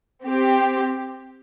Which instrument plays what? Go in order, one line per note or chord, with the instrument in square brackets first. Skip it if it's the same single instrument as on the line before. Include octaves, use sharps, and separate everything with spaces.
[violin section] C4 G4